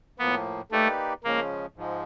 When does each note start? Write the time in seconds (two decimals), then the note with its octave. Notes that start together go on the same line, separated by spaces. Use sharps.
0.19 A2 F3 A#3 B3
0.72 A3 A#3 D#4 G4 B4 D5
1.24 C#3 F3 G#3 A#3 C#4
1.76 G#2 F3 G#3